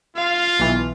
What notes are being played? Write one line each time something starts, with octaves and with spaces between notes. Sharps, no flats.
F4 F5
B1 B2 E3